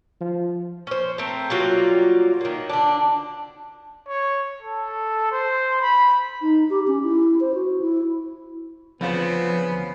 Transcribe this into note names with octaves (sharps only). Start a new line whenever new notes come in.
F3
C#4 C5
A3 C4 A#4
F#3 G3 A#3 F4
D#3 A#3
D3 D4
C#5
A4
C5
B5
D#4
G4
C#4
E4
C5
F#4
E4
D2 C#3 F3 B3 C4 F4 C5